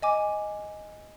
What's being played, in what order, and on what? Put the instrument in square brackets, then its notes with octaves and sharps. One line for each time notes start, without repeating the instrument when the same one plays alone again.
[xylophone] D#5 G#5 D6